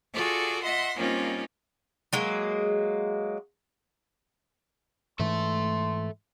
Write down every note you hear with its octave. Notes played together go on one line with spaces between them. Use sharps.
F4 F#4 G#4 A4 D5
D#5 E5 F#5 C6
G3 A#3 C4 C#4 D#4 F4
F#3 G#3 A#3
G#2 E3 A3 A4 E5 C6